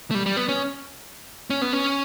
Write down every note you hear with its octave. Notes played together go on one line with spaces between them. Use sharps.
A3
G3
G3
B3
C#4
C#4
B3
C#4